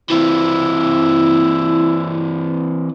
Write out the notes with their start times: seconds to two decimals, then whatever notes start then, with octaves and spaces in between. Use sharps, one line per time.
0.10 E3 C4 E4